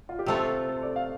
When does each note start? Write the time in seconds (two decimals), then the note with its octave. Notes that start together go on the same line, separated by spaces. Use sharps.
0.09 F4
0.19 G4
0.26 C3 A3 F4 A4
0.69 A4
0.83 D5
0.96 F5